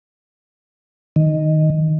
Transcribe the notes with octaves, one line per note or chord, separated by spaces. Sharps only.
D#3